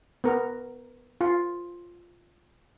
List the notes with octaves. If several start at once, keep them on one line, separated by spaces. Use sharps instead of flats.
B3 A#4
F4